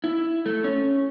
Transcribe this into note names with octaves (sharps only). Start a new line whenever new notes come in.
E4
A3
C#4